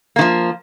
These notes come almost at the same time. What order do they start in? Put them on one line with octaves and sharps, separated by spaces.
A#3 D#3 F3